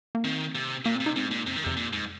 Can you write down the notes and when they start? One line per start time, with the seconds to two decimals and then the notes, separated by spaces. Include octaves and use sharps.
0.15 A#3
0.24 D#3 C4
0.55 C3
0.85 A#2 A#3
0.95 C4
1.00 C3
1.06 D#4
1.16 G#2 C4
1.31 A#2 G#3
1.46 F2 C3
1.56 D#3
1.64 F2 C3
1.77 A#2
1.93 G#2